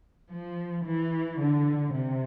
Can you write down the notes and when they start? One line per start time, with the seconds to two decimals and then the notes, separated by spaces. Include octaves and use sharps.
0.30 F3
0.85 E3
1.39 D3
1.95 C3